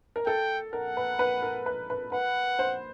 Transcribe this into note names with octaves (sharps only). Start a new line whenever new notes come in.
A#4
A4 G5
A#4 F#5
B4
B4
A#4
B4
B4
B4 F#5
C5